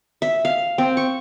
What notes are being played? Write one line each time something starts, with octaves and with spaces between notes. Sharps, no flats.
E5
F5
C4
C#6